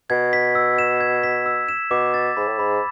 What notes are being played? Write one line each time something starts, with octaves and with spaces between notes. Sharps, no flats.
B2 G#6
B6
E6
E7
G#6
B6
E6
E7
B2 D6
A6
G#2 B5
A2
G#2 B5